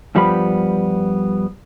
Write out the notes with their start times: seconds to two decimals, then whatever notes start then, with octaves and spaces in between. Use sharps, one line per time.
0.15 G2 F3 G3 B3 B5